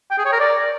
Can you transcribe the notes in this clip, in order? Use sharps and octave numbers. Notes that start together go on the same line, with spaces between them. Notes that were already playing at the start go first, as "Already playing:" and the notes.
G5
G#4
C#5
A#4
D5